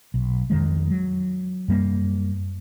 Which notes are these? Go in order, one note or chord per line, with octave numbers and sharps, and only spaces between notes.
B1
F2 D#3 G#3
F#3
F#2 G3 A#3